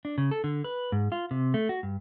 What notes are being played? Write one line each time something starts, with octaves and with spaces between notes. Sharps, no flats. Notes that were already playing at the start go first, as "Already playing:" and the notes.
D4
C#3
A4
D3
B4
G#2
F4
C3
A3
F#4
G2